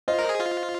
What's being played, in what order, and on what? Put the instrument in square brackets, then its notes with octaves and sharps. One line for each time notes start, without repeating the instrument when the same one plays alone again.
[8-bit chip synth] F4 [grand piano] C5 D#5
[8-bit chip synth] A#4
G#4
F4